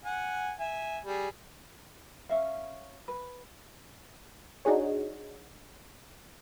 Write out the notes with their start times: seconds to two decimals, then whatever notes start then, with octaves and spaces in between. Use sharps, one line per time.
0.05 F#5 G#5
0.59 E5 G#5
1.05 G3 G#4
2.29 C#4 E5 F5
3.08 B4
4.65 D4 D#4 F#4 G#4 C#5